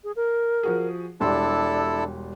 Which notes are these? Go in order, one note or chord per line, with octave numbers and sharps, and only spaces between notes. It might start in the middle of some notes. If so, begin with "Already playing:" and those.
G#4
A#4
F3 F#4 G#4
E1 G3 D4 E4 A4 A5 C6